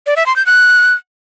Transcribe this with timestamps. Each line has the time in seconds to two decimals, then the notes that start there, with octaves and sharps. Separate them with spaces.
0.07 D5
0.16 E5
0.26 C6
0.36 G6
0.46 F#6